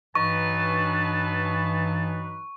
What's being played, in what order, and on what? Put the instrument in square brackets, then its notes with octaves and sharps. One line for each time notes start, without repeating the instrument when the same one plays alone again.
[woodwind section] G2 E3 [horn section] F#3 D#4 B4 [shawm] A5 [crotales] C#6